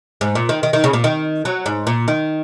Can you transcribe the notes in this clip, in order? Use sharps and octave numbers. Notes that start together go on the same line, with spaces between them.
G#2
A#2
D#3
D#3
D#3
C#3
A#2
D#3
F#3
G#2
A#2
D#3